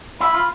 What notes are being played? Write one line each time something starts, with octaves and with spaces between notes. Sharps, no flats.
E4 B5
F4